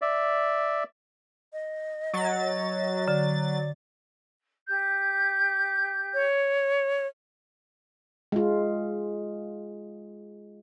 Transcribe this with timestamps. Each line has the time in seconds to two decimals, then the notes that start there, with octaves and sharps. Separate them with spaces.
0.02 D5 E5
1.53 D#5
2.14 F#3 A6
3.08 D3 D5
4.68 G4 G6
6.14 C#5
8.32 G#3 F4